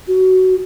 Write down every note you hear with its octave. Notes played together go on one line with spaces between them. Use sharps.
F#4